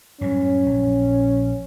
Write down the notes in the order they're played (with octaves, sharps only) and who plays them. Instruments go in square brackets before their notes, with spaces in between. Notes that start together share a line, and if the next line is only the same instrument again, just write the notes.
[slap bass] F#2 A2 G3 [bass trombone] C#4
[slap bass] A#1